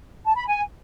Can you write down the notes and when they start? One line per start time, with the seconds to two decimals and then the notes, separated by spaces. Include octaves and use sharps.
0.25 A5
0.36 B5
0.47 G#5